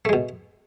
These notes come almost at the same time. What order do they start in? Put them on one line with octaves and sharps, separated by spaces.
A3 G#3 B2